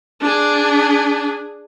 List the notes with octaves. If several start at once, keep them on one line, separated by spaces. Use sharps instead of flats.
D4 G#4